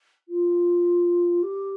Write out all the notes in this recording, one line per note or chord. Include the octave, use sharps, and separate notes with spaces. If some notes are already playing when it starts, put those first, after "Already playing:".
F4
G4